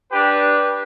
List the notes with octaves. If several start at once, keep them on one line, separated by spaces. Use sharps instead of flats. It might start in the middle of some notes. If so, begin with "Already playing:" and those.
D4 G4 B4